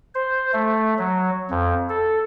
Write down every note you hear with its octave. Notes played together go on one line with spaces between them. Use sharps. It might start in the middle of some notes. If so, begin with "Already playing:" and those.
C5
A3
F#3
F2
A4